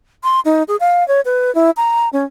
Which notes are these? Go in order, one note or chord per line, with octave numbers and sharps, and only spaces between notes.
C6
D#4
G#4
F5
C#5
B4
E4
A#5
C#4